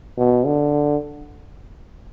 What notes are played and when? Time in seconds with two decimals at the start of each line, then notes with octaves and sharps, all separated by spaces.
0.18 B2
0.46 D3